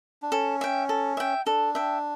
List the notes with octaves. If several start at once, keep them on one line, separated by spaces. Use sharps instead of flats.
D4
C#4 A4
E5 G5
A4
E5 G5
D4 A4
E5 G5